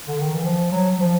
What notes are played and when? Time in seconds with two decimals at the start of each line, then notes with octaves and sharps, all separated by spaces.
0.08 D3
0.20 D#3
0.32 E3
0.44 F3
0.72 F#3
0.92 F#3
1.01 F3